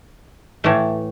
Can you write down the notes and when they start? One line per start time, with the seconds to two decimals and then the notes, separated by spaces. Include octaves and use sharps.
0.64 A2 E3 A3